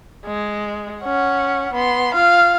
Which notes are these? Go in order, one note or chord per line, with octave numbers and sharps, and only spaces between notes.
G#3
C#4 F#5
B3 C6
F4 F5